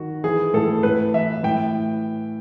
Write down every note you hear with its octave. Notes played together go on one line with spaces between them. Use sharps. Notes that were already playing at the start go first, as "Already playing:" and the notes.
Already playing: D#3 F#4
E3 G#4
A2 A4
A2 B4
E3 E5
A2 G5